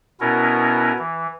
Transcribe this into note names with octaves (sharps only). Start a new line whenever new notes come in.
B2 B3 C#4 E4 A#4
E3